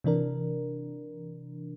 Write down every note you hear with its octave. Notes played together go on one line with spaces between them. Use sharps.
C3 E3 D4 A#4